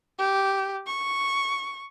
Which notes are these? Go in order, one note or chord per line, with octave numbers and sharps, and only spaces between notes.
G4
C#6